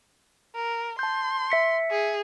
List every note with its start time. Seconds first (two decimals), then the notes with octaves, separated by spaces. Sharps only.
0.56 A#4
0.99 A5 C6 G6
1.50 E5 B6 C#7
1.91 G#4